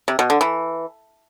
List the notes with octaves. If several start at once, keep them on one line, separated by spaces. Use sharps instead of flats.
C3
B2
D3
E3